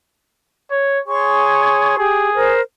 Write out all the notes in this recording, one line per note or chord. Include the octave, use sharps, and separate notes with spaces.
C#5
G#4 C#5 C6 C#6
G4 G#4
A#4 C5